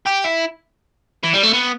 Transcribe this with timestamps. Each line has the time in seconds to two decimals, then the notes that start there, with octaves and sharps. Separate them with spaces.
0.07 G4
0.25 E4
1.23 E3
1.33 G3
1.43 A3
1.53 B3